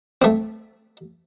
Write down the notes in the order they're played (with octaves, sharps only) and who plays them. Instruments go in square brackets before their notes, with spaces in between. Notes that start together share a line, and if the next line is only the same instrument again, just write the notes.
[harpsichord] A3 C4